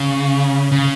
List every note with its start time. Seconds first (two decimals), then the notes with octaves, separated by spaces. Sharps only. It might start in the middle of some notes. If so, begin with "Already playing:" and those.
Already playing: C#3
0.72 C#3